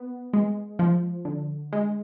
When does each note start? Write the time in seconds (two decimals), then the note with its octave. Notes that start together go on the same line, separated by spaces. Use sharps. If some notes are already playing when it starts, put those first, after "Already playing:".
Already playing: B3
0.33 G#3
0.79 F3
1.25 D3
1.72 G#3